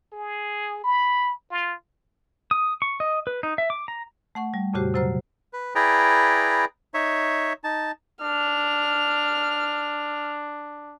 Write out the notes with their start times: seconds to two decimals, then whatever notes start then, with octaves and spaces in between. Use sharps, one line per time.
0.13 G#4
0.84 B5
1.51 F4
2.51 D#6
2.82 C#6
3.00 D#5
3.27 B4
3.43 D#4
3.58 E5
3.70 D6
3.88 A#5
4.35 A3 F#5 C#6
4.54 G3
4.74 F2 A#2 C#3 F#4 G4 C5
4.94 C3 F#3 C5 A#5 F6
5.53 B4
5.75 E4 G#4 B4 D5 G5 A#5
6.94 D#4 C#5 E5
7.64 D#4 A5
8.22 D4 F6